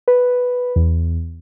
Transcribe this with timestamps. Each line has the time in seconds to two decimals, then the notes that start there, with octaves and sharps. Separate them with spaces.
0.08 B4
0.76 E2